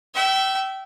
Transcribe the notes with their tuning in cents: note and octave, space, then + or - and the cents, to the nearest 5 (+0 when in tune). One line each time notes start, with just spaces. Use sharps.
E5 +0 G5 -30